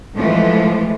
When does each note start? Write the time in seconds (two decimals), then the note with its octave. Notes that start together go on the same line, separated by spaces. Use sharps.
0.16 A2 E3 F3 G#3 A3